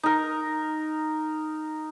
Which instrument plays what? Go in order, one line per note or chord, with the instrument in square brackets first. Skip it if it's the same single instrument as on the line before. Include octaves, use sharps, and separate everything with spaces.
[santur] D#4 A#4